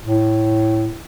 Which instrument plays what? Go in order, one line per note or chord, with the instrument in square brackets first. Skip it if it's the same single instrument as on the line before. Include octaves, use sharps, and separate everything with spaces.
[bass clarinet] A2